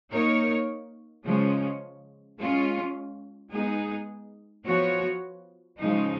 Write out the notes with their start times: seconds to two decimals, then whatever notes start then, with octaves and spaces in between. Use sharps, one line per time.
0.11 A#3 D#4 A#4 C#5
1.24 C#3 F3 G#3 C#4
2.38 G#3 C#4 F4
3.51 G#3 B3 D#4 G#4
4.64 F3 B3 F#4 C#5
5.78 C#3 F3 G#3 D#4